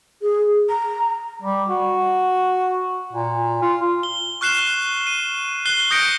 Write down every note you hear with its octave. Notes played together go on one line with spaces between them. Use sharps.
G#4
A#5
G3
F#4
A#2
F4
G7
C#6 F6 F#6 C7 E7 G7
D#7
F#6 C7 G7
D#6 G6 A#6 C#7 D7